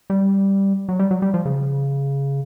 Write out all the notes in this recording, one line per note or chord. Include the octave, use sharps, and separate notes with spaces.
G3
F#3
G3
F#3
G3
F3
C#3